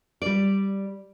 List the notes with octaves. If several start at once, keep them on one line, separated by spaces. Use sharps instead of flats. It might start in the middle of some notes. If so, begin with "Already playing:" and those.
G3 D5